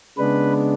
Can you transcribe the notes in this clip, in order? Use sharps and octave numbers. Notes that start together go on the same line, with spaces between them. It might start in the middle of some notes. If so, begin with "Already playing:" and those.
C#3 G#3 B3 D4 B4